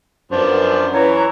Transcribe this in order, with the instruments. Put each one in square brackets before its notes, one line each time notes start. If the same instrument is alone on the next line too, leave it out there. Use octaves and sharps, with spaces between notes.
[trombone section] F#2 [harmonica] F3 B3 D4 [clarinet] C5
[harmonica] E3 [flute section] B4 A#5 [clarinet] C#5